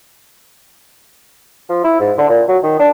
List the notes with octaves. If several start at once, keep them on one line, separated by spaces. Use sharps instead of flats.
F3
E4
G#2
D3
A#2
F#3
D#3
D4